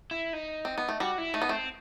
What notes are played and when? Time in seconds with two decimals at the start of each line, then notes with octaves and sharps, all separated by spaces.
0.11 E4
0.33 D#4
0.65 C4
0.78 B3
0.89 A3
1.00 G3 F#4
1.18 E4
1.34 A3 D#4
1.42 B3
1.49 A3 C4